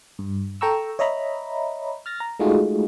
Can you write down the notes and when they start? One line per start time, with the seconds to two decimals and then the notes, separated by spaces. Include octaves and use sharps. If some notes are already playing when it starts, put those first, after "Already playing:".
0.19 G2
0.61 A4 G5 A#5 C#6 E6
0.99 C#5 D#5 E5 A#5 B5
2.06 F6 A6 A#6
2.20 A#5
2.39 G#3 A3 D#4 F4 F#4 G#4